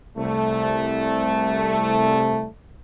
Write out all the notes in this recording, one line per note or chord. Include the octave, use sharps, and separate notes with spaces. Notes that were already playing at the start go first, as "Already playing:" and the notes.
C2 A3